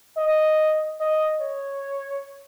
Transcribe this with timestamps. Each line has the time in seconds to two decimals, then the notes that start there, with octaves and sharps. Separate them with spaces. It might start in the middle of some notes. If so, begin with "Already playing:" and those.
0.17 D#5
1.00 D#5
1.40 C#5